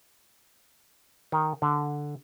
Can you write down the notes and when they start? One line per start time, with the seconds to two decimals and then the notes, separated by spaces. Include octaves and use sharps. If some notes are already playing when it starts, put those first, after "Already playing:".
1.32 D#3
1.62 D3